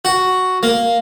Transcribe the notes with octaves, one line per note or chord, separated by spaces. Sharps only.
F#4
A#3